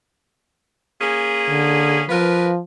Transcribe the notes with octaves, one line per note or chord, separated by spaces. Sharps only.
A#3 C#4 G#4
D3
F3 F4 A#4 B4